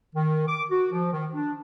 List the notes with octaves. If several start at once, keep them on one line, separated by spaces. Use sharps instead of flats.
D#3
D6
F#4
F3
D#3
D4